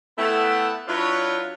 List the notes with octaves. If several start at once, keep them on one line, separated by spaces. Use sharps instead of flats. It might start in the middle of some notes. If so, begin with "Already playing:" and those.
A3 B3 E4 A4 F#5 G5
F#3 D4 E4 F4 B4 C#5